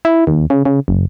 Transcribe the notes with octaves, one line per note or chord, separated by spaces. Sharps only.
E4
D#2
C#3
C#3
F#1